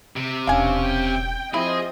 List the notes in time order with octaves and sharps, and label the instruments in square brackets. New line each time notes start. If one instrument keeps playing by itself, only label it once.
[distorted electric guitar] C3
[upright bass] E1 [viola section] C#4 D4 [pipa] F5 G#5
[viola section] G5
[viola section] F3 C4 D#5 [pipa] E4 [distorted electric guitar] G#4